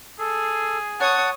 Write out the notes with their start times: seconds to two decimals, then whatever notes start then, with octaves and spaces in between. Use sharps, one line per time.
0.19 G#4 A4
1.00 C#5 F#5 A5 D#6